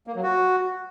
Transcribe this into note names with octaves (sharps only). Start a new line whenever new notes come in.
A#3
F#3
F#4